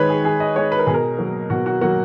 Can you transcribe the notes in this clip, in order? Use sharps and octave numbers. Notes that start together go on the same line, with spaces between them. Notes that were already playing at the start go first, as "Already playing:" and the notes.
Already playing: D#3 G#3 B4 C#5
G#4
D#3 G#4
D#5
G#3 C#5
B4
A#4
B2 G#4
A#4
F#3 A#3
B2 F#4
F#4
F#3 A#3 F#4